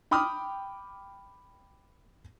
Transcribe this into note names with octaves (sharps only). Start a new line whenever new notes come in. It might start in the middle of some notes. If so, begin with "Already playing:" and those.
G5 B5 D6 D#6 F6